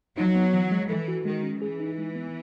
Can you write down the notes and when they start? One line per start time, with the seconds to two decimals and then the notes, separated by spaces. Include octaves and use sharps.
0.17 F#3 D#4
0.36 B3
0.54 E3
0.71 G#3
0.89 E3 A4
1.08 F#4
1.25 D#3 G#3
1.43 C#4
1.62 E3 G#4
1.80 D#4
1.98 G#3
2.15 B3